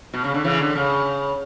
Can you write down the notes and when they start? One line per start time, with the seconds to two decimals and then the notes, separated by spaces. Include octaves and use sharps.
0.14 B2
0.24 C#3
0.34 D3
0.44 C#3 E3
0.60 D3
0.76 C#3